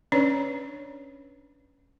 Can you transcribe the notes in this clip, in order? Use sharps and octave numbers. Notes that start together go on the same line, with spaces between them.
C#4 D4 B4 C#5 D5